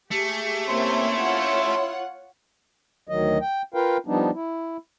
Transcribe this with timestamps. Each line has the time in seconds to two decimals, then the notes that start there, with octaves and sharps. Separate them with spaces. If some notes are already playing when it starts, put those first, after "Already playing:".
0.11 A3 G4 G#4
0.69 C3 A#3 C#4 E4 C6
1.15 F4 C#5 F#5
3.08 D2 D#3 F#3 D#5
3.41 G5
3.74 F4 A#4 B4 F5 G5
4.07 F3 G3 B3 D4 D#4
4.34 E4